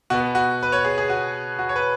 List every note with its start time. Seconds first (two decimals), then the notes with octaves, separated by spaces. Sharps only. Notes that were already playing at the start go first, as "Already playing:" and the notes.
0.10 B2 B3 F#4
0.35 F#4
0.63 B4
0.72 C#5
0.85 G#4
0.98 G#4
1.10 F#4
1.59 F#4
1.69 C#5
1.76 B4